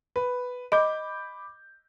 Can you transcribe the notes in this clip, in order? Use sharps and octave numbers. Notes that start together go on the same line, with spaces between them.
B4
D#5 B5 D6 G6